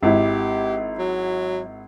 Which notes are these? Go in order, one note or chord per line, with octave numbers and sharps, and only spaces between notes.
G#1 E4 G4
F#3